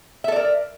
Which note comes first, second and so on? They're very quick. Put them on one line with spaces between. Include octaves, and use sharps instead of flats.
E5 A4 D5 A#4